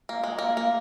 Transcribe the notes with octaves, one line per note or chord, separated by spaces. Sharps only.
A#3
G#3
A#3
A#3